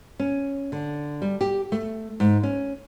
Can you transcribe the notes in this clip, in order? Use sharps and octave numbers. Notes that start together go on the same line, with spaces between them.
C#4
D3
G3
G4
A3
G#2
C#4